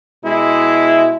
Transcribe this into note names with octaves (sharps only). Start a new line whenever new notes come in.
B2 G#3 E4